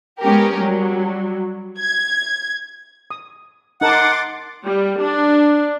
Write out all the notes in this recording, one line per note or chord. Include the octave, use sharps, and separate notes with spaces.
G#3 B3 C#4 G4 A#4
F#3 G3
G#6
D#6
D#4 A#4 F#5 A5 C6 D6 A6
G3
D4